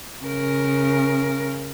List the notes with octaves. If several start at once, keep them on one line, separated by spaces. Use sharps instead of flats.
C#3 A#4